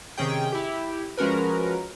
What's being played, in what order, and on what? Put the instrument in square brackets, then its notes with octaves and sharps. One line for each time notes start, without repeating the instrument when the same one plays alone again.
[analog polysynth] C3 D#3 C#4 G#4 G5
E4 G4
F3 G#3 C#4 F#4 A#4 B4